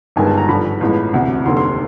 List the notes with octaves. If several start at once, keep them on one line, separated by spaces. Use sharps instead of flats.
G1 G2 D#3 G#3 G#5
A5
A#5
G#1 G2 D3 F3 B5
A1 A2 F3 G#3 B3
E1 D2 C3
F1 D#2 D3 C6
C6